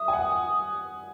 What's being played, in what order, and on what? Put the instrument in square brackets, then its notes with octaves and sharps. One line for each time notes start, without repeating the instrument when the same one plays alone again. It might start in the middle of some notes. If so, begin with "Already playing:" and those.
Already playing: [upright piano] E5 [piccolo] D#6
[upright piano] G#5
F#5